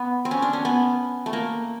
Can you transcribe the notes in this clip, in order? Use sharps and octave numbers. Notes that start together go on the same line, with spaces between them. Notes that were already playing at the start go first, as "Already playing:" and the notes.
Already playing: B3
C4
C#4
D4
C#4
B3
A3
A#3